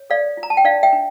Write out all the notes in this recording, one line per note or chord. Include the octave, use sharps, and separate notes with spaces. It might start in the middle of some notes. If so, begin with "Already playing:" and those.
Already playing: C#5
A4 D5 F5
F4
A#5
A5
G5
D4 D5 F5
E5 G5
D4